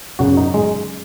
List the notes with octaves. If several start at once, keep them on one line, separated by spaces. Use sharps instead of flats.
F#2 C#3 F#3 F#4
D#4
G#3